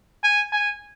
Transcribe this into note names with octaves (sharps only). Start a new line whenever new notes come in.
G#5
G#5